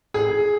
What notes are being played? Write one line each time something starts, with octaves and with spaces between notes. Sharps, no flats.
G#4